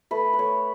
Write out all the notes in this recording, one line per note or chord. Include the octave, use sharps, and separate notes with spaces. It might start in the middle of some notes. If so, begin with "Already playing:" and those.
A3 B4
B4
A3 C#5